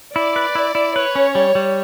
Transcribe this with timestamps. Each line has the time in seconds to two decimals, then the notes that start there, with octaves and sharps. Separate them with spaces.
0.15 E4 D5
0.36 B4
0.55 E4
0.75 E4
0.96 B4 C#5
1.15 C#4
1.35 G3
1.55 G3